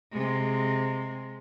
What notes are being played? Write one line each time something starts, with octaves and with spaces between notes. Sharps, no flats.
C3 G#3